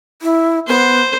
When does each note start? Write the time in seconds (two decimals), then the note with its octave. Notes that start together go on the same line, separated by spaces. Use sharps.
0.22 E4
0.68 B3 C5